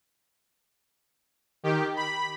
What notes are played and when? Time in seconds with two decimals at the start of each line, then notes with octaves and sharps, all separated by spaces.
1.63 D#3 G4
1.96 B5